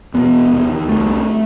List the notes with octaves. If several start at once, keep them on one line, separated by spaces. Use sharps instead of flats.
E2 B2 B3
D#2
C2 C3 A3